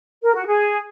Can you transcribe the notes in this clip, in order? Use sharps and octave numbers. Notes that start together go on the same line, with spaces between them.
A#4
F#4
G#4